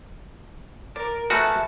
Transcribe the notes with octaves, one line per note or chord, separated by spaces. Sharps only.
A#4 D5
A3 F#4 G#4 A#4 B4 E5 A5